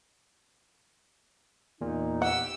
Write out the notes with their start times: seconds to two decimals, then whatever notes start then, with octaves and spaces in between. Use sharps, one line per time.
1.81 E2 A#2 D#4
2.22 G4 F#5 E6